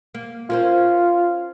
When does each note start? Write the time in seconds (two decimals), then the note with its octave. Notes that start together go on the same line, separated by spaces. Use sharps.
0.15 A#3
0.50 C#4 F4 A#4 C5